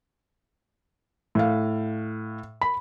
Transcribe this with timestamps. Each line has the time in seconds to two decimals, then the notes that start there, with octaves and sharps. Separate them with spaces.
1.35 A2 F5
2.61 B5